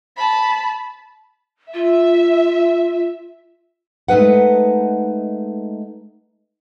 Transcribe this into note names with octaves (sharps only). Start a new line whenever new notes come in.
A5 B5
F4 E5
G#3 A3 D#4 B4 F#5